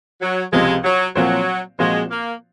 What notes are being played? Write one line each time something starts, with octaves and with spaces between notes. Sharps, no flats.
F#3
C#2 C3 F3 G#3
F#3
A#2 F3 F#3 C4 F#4 C5
A#2 F3 G#3 C4 F#4 C5
A#3